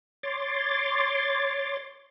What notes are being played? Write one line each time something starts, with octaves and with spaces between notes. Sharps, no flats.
C#5 C6 D6 A6